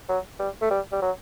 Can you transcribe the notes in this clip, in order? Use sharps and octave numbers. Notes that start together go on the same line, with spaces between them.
F#3
G3
A3
G3
G3
F#3